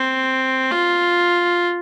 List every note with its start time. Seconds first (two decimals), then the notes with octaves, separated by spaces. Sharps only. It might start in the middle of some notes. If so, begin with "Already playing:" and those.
Already playing: C4
0.72 F4